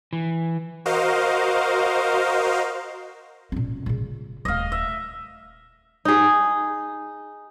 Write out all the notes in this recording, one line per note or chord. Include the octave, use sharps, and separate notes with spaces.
E3
F#4 A#4 C5 D#5 F5
A#2 C#4
A#2 C#3
D#1 A3 D#5 F5
E5
D#4 G#4